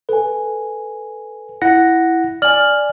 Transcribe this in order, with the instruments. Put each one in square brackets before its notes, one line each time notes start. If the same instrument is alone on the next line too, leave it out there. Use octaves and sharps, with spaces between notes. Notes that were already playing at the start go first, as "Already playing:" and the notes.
[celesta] A4 G#5 [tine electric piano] B4
[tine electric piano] E4 F#5 A#6
[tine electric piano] D5 G#5 [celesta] F6 F#7